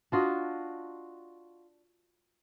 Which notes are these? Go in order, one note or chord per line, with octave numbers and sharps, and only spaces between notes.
D4 F4 F#4 D#5